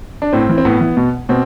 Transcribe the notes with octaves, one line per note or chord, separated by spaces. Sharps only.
D4
A2 C4
E3
C4
A2 B3
E3
B2
B2 C4